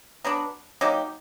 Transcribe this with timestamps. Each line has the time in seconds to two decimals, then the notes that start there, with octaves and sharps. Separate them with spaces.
0.24 F#3 B3 D4
0.81 F#3 A#3 D#4 G4